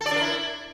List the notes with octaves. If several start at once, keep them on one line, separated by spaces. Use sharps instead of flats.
A4
D5
D4
A#4
E4